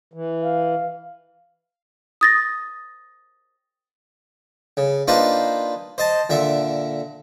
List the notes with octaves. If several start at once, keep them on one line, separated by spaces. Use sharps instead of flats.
E3
F5
D#6 A6 A#6
C#3
A#3 D4 D#4 F4 B4 C5
C5 D#5 A5
A#2 D3 E5